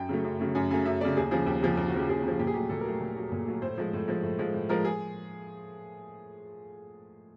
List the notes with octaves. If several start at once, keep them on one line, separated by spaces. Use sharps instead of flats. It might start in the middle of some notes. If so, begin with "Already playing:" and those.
Already playing: F#2 G5
C#3 F#3 A3
F#2
C#3 F#3 A3
F#2 G#5
C#3 F#3 A3 G#5
F#2 E5
C#3 F#3 A3 D5
D#2 G#4
C#3 F3 G#4
D#2 G4
C#3 F3 G#4
D#2
F#4
C#3 F3 G4
D#2 G#4
C#3 F3
A#2 G4
G#4
F#3 A3 G4
A#2 A4
A#4
F#3 A3
A#2
F#3 A3
A#2
F#3 A3
A2 C5
F3 G#3
A2
F3 G#3
A2
F3 G#3
A2
F3 G#3 A#4
G#4